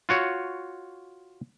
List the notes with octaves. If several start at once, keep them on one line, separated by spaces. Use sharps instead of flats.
F4 F#4 C#5